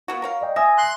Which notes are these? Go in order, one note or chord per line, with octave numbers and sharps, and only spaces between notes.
A#3 B3 F#4
A#4 C#5 F5
D5 D#5 G5
E5 G#5 D#6 A#6
C6 F#6